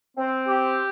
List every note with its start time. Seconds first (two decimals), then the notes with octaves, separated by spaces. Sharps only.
0.17 C4
0.47 G4